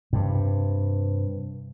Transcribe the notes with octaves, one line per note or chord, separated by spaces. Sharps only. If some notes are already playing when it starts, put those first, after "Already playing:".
G2 C3